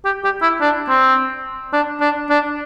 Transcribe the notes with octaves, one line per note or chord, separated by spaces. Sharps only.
G4
G4
E4
D4
C4
D4
D4
D4